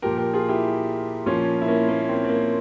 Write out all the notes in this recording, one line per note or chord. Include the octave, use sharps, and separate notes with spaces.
A#2 F3 G4 A#4
G4 A#4
F4 G#4
E4 G4
A#2 F3 C#4 F4
E4
A#3 C#4
A#3 C#4
C4
C4
A#3